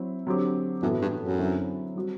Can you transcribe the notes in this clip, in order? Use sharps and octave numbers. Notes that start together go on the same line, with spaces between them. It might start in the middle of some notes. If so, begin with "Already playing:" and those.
Already playing: F#3 C4 E4
D3 F#3 C4 G4
F#2 A2 E3 B3 F#4 A4
G2
F#2
D3 F#3 C4 E4
G3 C4 F#4